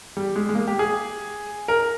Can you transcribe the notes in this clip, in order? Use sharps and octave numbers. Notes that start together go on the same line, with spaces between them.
G3
G#3
G#3
A#3
G4
G#4
A#4